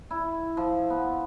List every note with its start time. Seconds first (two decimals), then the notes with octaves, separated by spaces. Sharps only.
0.11 E4
0.57 F3
0.90 B3